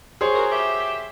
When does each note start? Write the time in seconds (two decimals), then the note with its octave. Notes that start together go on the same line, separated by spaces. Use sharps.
0.21 G#4 C5 C#5
0.35 F#4 A#4
0.51 F#4 G4 E5